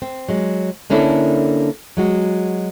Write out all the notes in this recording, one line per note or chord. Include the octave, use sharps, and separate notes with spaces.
C4
F#3 G#3
D3 A#3 C#4 D4 E4 A4
F#3 G#3 F#4